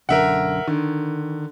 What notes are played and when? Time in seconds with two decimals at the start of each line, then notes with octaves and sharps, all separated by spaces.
0.09 B1 F#2 D3 A#4 E5 F#5
0.67 D3 D#3